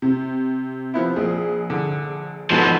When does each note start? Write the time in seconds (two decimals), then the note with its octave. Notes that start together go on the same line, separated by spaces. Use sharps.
0.02 C3
0.94 F3 B3 E4
1.16 A#1 G#4
1.70 D3
2.50 G#2 B2 F3 B3 A4